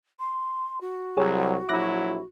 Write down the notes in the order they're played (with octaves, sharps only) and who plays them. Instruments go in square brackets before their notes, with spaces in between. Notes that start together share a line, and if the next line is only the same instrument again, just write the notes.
[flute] C6
F#4
[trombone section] C2 F#3 [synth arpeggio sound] G4 G#4 C#5
[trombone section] A#1 F#3 E4 [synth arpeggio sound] D6 F#6 A#6